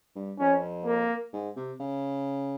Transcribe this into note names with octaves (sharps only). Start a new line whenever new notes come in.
G2
F2 C#4
A#3
G#2
C3
C#3